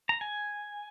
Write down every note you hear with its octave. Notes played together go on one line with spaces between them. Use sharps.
A#5
G#5